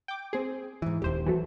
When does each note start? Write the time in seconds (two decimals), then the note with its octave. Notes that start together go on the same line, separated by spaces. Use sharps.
0.08 G5 D6
0.33 C4 G#4
0.82 G#2 E3
1.02 D#1 D#2 G4 C5
1.26 E3 F#3 A3